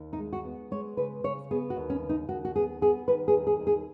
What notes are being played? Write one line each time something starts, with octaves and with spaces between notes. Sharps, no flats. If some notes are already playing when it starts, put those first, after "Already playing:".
Already playing: D#2
D#4
G#3
F#4
B3
G#3 C#5
C#3 B4
C#3 C#5
B3 G#4
F#4
D#2
C#4
C#3
D#4
D#2 F#4
F#4
B3 G#4
B3 G#4
D#3 B4
G#4
D#2
G#4
D#2
G#4